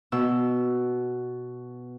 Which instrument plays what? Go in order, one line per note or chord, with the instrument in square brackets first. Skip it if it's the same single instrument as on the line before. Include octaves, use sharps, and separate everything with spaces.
[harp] B2 E6